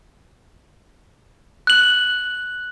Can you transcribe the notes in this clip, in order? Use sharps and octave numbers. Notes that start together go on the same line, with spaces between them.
F#6 F#7